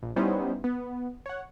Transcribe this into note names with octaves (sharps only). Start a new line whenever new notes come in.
A#1
G3 B3 C#4 D#4 E4 C5
B3
C#5 F#5